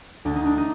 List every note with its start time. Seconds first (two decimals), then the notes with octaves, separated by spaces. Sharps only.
0.25 D2 D4
0.36 D#4
0.46 D4
0.57 D#4